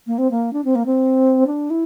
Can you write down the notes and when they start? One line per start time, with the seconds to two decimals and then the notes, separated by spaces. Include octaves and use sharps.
0.07 A#3
0.18 C4
0.31 A#3
0.53 D4
0.65 C4
0.75 A#3
0.86 C4
1.47 D4
1.70 E4